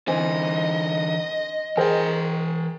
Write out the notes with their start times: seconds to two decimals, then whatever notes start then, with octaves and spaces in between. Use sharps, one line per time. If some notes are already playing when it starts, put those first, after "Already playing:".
0.08 D3 E3 C4 D#5 G#5
1.77 E3 G#4 A#4 C5 G5